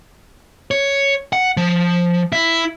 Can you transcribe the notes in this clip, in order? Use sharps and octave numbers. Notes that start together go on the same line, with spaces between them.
C#5
F#5
F3
E4